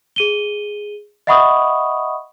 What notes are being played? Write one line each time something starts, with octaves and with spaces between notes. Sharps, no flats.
G#4 D#7 G7
D#5 E5 F#5 B5 C#6 D#6